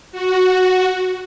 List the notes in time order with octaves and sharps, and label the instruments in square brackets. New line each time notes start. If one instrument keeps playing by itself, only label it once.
[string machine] F#4